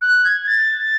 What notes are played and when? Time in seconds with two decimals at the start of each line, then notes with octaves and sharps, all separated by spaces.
0.02 F#6
0.24 G#6
0.47 A6